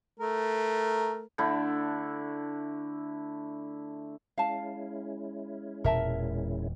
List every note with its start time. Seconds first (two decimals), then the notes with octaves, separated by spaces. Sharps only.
0.20 A3 A#4
1.38 D3 A3 D4 E4
4.38 G#3 C#4 E4 F5 A5
5.84 E1 A#2 E3 A#4 E5 A5